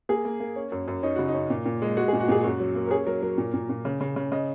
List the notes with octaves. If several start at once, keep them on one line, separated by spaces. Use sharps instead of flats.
A#3 G#4
A#3
A#3
C#4
F#2
F#2
C#4 D#4
C#3 F#4
D#4
C#4
A#2
A#2
G#3
G#3 F#4
A#2 G#4
F#4
A#2 G#4
F#2 F#4
F#3
A#3
A#4
C#4 G#4
F#3 A#4
F#3 A#4
A#2
A#2
A#2
C#3
C#3
C#3
C#3 D#5